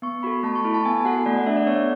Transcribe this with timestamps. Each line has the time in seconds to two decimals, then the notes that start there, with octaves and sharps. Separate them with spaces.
0.02 B3 C#6
0.23 F#4 A4 B5
0.43 A3 A5
0.55 C#6
0.65 E4 A4 B5
0.74 A5
0.85 B3 G#5
1.01 G#5
1.05 F#4 A4 F#5
1.26 A3 D5
1.37 F#5
1.46 D4 A4 E5
1.57 D5
1.67 B3 C#5